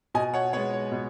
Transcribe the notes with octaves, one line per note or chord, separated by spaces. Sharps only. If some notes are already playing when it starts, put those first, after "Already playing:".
B2 D#5 G#5
C#5 F#5
G#3 B3 C#5 F#5
C#5
B2